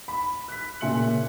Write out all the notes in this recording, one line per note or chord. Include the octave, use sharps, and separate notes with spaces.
B5
F#6 B6
A#2 C#3 E5 C6 C#7 F#7